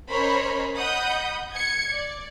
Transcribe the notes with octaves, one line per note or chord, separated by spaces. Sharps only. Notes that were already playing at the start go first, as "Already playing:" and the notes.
C#4 A#4 C5 C#5 D#5 B5
D#5 F#5 B5 D#6 G6
G#6 C#7
D5